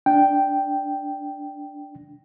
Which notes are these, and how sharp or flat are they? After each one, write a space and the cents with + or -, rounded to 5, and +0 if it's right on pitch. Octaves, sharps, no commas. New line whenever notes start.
D4 +0 G5 +0